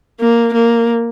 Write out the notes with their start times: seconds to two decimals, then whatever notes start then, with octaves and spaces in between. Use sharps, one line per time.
0.20 A#3
0.53 A#3